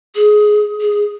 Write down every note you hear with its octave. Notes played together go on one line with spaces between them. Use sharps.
G#4
G#4